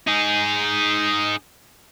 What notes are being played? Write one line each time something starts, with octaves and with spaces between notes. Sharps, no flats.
D#4 G#4